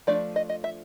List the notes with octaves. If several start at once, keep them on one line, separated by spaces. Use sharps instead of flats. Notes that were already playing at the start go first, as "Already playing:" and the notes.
F3 A3 D4 D5
D#5
D#5
E5